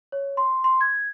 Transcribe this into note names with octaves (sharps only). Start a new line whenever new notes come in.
C#5
C6
C6
G#6